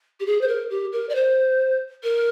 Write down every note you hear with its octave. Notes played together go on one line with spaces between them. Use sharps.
G4
G#4
C5
A#4
G4
A#4
D5
C5
A#4